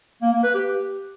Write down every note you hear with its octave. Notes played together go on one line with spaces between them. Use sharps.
A#3
A#3
B4
G4